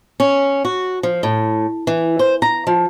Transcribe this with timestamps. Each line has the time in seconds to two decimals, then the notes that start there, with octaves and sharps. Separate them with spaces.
0.20 C#4
0.65 F#4
1.03 F3
1.23 A2
1.87 E3
2.19 C5
2.42 A#5
2.67 F3